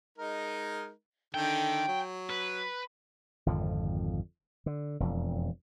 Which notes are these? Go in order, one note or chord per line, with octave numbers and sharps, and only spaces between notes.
G#3 D#4 A#4
D3 D#3 A4 G5
F#3
B4
G#1 F2 D3 F3
D3
E1 F2